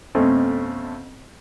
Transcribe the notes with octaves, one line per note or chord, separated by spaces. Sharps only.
F2 B2 A3 C4 C#4